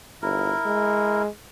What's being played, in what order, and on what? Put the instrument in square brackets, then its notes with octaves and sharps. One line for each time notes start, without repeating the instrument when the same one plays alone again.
[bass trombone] G1 [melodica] E4 A#4
[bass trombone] G#3